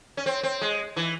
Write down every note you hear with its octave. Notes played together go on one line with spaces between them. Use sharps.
C#4
C4
C4
G#3
E3